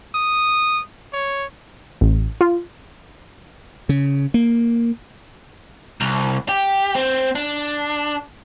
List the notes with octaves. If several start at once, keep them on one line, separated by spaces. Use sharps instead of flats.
D#6
C#5
A1
F4
C#3
A#3
C2
G4
C4
D4